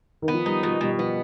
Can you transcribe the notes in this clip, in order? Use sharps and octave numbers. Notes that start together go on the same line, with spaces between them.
D#3
B3
F3
G3 D#4
B2 F3
B2 G3
F3 B3